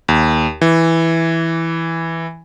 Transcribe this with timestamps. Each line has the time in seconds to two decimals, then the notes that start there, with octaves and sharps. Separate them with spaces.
0.08 D#2
0.61 E3